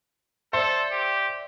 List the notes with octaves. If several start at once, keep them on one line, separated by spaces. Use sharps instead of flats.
A4 C5 D5 E5
G4